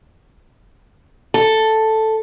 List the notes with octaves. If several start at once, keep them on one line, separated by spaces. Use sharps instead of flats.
A4